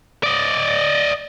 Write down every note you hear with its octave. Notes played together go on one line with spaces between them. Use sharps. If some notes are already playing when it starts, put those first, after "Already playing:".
D5 D#5